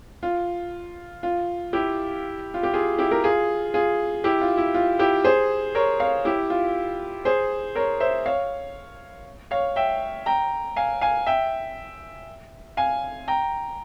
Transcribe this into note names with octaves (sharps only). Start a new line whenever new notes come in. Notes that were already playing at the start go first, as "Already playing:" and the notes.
F4
F4
E4 G4
F4
G4
F4 G#4
E4 G4
G4 A#4
F4 G#4
F4 G#4
E4 G4
F4
E4
F4
E4 G4
G#4 C5
A#4 C#5
C#5 F5
E4 G4
F4
G#4 C5
A#4 C#5
C5 E5
C#5 F5
C#5 F5
E5 G5
G5 A#5
F5 G#5
F5 G#5
E5 G5
F5 G#5
G5 A#5